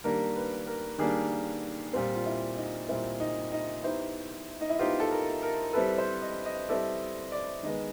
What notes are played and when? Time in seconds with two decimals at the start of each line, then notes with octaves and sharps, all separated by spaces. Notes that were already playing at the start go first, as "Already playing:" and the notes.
0.04 D#3 G3 A#3 D4 A#4
0.36 B4
0.67 A#4
0.98 D#3 G3 A#3 D4 G#4
1.93 A#2 G3 C4 F4
2.15 F4
2.26 E4
2.57 D#4
2.89 A#2 G3 C4 E4
3.20 D#4
3.52 D#4
3.83 B3 D#4 E4 G4 C5
4.61 D#4
4.70 E4
4.79 B3 D#4 F4 G4 C5
5.00 A4
5.11 A#4
5.43 A#4
5.73 G3 C4 E4 A4 B4
5.98 C5
6.22 D#5
6.45 D#5
6.69 G3 C4 E4 A4 D5
7.32 D5
7.63 D#3 G#3 B3 D#5